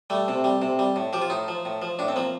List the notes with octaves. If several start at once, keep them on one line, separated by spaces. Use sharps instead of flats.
G3 A3
C3
G3
C3
G3
A2
F3 G4
F4
A2 D#4
F3
A2
F3
A2 D4
C4
F3 A#3